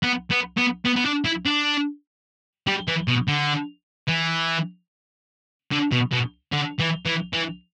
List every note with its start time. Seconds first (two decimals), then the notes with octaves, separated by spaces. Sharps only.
0.03 B3
0.31 B3
0.58 B3
0.85 B3
0.96 B3
1.06 D4
1.25 E4
1.45 D4
2.67 G3
2.88 E3
3.08 B2
3.28 D3
4.08 E3
5.72 D3
5.92 B2
6.12 B2
6.52 D3
6.79 E3
7.06 E3
7.33 E3